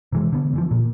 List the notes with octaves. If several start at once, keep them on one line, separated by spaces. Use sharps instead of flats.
C3 E3 G#3
D3 B3
D3 E3 F3
A#2